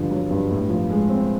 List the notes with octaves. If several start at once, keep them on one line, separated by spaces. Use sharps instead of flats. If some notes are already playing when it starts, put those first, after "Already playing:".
Already playing: G2 D3 F3
F#3
G2
A2
F3
G#3
C4